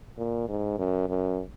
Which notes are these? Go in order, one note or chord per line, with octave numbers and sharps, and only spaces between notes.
A#2
G#2
F#2
F#2